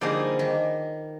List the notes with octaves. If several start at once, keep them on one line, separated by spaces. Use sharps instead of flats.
D3 F3 G3 A#3 D#4 G#4
D#3